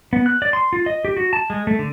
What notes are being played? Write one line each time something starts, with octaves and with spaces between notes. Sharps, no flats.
B3
F#6
D5
C6
F4
D#5
G4
F#4
A5
G#3
A3
D3